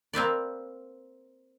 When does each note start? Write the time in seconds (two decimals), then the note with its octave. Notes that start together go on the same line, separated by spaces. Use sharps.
0.13 A#3 C4 B4 D5